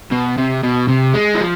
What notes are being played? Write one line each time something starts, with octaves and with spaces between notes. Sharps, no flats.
B2
C3
B2
C3
G#3
E3
F3